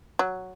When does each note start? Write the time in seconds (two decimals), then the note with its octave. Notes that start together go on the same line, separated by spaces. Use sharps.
0.19 F#3